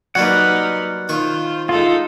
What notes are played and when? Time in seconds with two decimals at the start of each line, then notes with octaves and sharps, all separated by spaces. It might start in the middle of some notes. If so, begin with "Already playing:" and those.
0.15 F#3 G3 A#3 D#4 A#4 B4 F#5
1.09 D#3 F4 C5 C#6
1.69 G#3 D#4 F4 A4